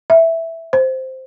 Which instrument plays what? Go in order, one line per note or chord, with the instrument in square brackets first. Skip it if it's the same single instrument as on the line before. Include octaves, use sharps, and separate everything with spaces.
[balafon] E5
C5